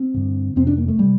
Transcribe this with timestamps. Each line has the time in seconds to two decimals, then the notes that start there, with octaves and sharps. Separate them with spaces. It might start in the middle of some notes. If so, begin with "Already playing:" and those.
Already playing: C4
0.14 G2 D3
0.56 F2 C3 C4
0.67 D4
0.78 A#3
0.88 A3
0.99 C3 G3